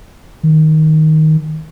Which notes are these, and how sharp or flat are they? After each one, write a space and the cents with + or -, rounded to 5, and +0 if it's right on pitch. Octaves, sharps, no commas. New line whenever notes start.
D#3 +5